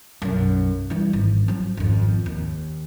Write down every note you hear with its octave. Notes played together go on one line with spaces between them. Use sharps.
B1 F#2
E3 G3
G#1
F3 F#3
G#1 F2
D#2